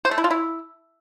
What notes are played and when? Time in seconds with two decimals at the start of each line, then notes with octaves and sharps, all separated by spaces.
0.05 C5
0.11 A3
0.18 E4
0.24 F4
0.30 E4